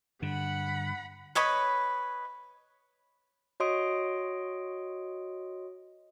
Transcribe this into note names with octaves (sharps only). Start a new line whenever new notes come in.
G2 D3 F#5 B5
B4 C#5 D#5 B5
F#4 C#5 D#5 C6 D#6 D7